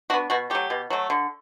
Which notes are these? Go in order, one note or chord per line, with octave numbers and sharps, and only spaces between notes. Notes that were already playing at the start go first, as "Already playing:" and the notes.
B3 D4 F#4
B2 F#4
F#3 A3 G4
B2
F#3 A3
D3